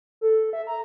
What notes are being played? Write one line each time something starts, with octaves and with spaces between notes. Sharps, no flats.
A4
E5
A#5